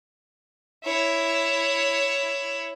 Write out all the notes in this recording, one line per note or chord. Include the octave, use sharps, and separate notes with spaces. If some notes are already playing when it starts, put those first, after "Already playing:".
E4 C#5